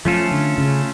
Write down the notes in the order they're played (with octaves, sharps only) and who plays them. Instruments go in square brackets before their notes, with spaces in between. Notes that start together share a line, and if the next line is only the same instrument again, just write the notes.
[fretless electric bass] F3 [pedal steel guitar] A3 C#4 F4 A4
[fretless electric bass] D3
C#3